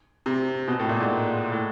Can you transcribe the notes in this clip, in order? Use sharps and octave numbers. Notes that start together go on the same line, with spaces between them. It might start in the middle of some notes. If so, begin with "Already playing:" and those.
C3
B2
A2
A#2
G#2
A2